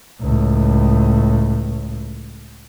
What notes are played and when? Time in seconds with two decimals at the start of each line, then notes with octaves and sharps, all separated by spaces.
0.21 C#2 A2